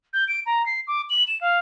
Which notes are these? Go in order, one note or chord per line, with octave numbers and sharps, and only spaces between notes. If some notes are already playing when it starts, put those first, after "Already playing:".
G6
D7
A#5
C7
D6
F#7
E7
F5